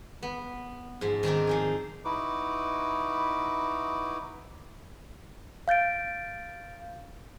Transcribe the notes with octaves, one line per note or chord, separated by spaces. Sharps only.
B3
G#2 F3
D#3 C4 D4 A#4
F3 D#4 G#4
D#4 E4 F#4 B4 D6
F5 G6 A6 D7